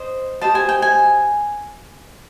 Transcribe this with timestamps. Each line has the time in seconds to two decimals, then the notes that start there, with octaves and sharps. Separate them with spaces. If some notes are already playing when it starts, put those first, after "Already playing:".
Already playing: C5 D#5
0.41 G4 C5 D#5 A5
0.55 G#5
0.69 G5
0.82 G#5